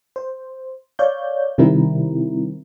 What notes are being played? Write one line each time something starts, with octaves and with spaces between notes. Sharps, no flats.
C5
C#5 D5 F5 G6
C3 D#3 G3 C4 E4 A#4